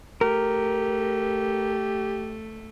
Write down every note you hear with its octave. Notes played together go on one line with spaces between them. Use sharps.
A3 G4 A#4